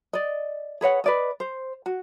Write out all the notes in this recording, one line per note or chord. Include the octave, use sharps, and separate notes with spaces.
D5 D#5
G#4 B4 C#5 F#5
B4 D5 D#5
C5
F#4